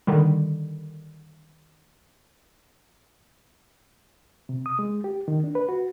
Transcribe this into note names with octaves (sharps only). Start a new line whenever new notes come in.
D3 D#3 G3
C3
D#6
G#3
G4
D#3
D4
B4
F#4